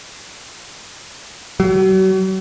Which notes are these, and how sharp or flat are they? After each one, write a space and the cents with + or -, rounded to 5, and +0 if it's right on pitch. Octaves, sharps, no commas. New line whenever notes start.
F#3 +40